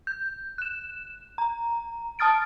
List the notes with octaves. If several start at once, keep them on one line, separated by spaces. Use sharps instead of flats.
G6
F#6 E7
A#5
A5 D#6 F6 A6 D7